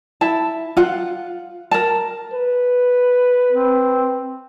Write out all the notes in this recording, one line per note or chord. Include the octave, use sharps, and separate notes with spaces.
E4 A5
F4 F#5
A#4 A5
B4
C4